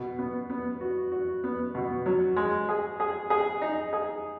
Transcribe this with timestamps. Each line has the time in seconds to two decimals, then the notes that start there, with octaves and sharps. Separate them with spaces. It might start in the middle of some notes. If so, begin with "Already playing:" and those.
Already playing: B2
0.19 B3
0.50 B3
0.81 F#4
1.12 F#4
1.44 B3
1.75 B2
2.06 F#3
2.36 G#3
2.69 G#4
3.00 G#4
3.30 G#4
3.62 D#4
3.93 G#4